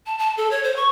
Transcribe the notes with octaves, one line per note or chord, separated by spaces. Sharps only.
A5
A5
A4
C#5
C5
C#6